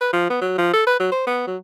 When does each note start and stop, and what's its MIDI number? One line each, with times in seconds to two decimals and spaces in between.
0.01 0.09 71
0.13 0.25 53
0.30 0.41 59
0.41 0.56 54
0.58 0.71 53
0.74 0.83 69
0.87 0.98 71
1.00 1.10 54
1.12 1.24 72
1.27 1.47 59
1.47 1.57 54